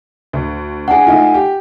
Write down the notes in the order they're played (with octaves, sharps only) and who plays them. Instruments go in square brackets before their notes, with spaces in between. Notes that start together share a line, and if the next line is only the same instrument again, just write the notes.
[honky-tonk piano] D2
[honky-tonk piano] D4 G#4 [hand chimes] F#5 G#5
[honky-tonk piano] A3 D#4 F4
G4